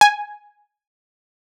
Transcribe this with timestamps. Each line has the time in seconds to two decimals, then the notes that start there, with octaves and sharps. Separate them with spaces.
0.01 G#5